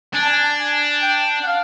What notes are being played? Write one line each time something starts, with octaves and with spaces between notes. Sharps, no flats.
D4 G#5
A5
G#5
G#5
G5
F#5
F5